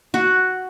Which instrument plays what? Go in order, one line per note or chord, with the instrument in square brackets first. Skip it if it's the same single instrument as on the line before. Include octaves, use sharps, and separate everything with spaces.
[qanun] F#4